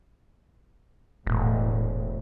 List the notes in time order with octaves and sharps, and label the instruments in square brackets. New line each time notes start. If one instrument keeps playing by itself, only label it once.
[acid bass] E1 [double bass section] A2